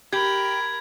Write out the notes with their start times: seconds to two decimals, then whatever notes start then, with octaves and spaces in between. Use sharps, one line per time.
0.13 G4 A#4 B5 G#6